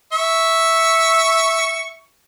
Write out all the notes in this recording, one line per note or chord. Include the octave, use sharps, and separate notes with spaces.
E5 C#6